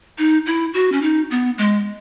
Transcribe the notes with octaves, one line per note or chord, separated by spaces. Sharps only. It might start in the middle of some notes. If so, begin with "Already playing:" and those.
D#4
E4
F#4
C#4
D#4
B3
G#3